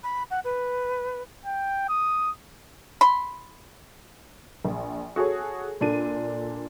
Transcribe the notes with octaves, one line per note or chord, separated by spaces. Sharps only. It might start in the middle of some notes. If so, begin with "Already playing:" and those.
B5
F#5
B4
G5
D#6
B5 C6
A#1
F#4 G#4 A4 C#5
A#2 D4 A4 D#7